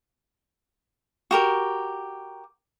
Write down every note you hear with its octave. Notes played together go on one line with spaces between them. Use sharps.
F#4 G4 A#4